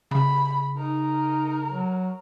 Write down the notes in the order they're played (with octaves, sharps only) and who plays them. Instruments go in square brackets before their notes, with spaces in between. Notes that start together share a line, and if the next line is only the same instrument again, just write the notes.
[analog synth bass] C#3 [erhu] B5
[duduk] D#4 [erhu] A#4
[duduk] F#3